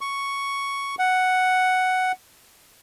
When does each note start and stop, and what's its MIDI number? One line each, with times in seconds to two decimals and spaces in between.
0.01 0.95 85
0.99 2.12 78